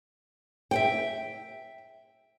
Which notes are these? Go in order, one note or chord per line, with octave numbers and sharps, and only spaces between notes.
E5 F#5 G5